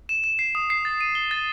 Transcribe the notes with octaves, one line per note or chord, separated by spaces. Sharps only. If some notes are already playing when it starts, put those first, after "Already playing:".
E7
E7
C7
D#6
C7
A6
D#7
G7
A6